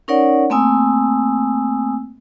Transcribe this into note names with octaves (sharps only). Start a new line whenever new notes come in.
C#4 D#4 A#4 C#5 D5 F#5
A3 A#3 C4 G#5 D#6 E6